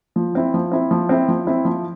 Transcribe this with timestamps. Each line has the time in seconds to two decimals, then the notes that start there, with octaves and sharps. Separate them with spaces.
0.16 F3
0.35 C4 E4
0.54 F3
0.72 C4 E4
0.91 F3
1.09 C4 E4
1.28 F3
1.47 C4 E4
1.65 F3